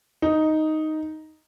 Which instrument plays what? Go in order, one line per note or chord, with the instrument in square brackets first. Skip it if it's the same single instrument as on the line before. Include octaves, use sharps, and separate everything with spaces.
[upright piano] D#4